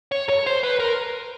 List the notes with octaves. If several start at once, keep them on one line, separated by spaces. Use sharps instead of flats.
C#5
C#5
C5
B4
A#4